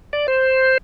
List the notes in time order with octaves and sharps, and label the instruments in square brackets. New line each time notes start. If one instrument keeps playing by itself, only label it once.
[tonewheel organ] D5
C5